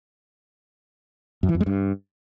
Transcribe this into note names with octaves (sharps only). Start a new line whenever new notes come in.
F#2
E3
F2
G#3
G2